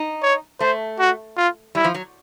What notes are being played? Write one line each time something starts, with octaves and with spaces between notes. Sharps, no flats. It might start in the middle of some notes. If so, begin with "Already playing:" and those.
Already playing: D#4
C#5
A3 C5
F#4
F4
G3 E4
F3
F#3